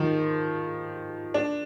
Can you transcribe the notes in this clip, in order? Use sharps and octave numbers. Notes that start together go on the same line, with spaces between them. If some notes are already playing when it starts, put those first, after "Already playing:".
Already playing: D#3 F3
D4